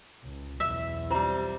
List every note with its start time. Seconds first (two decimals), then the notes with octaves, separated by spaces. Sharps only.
0.23 C#2
0.60 B1 E2 E5
1.10 G3 C4 F4 C5 A#5